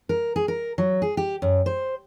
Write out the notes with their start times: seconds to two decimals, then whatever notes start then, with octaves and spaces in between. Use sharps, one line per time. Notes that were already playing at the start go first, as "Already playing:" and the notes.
0.09 A#4
0.36 G#4
0.48 A#4
0.78 F#3
1.02 G#4
1.17 G4
1.42 F#2
1.66 C5